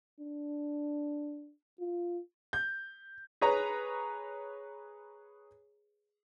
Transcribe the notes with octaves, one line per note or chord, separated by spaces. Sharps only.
D4
F4
G6
G#4 B4 C#5 A#5